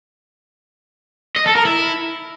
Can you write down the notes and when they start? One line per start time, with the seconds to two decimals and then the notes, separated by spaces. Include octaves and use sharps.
1.36 D#5
1.46 A4
1.56 A#4
1.65 E4